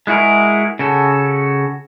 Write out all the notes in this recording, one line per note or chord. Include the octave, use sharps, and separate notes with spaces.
G#3 E4 F#4 G#4 A#4
C#3 F#4 A4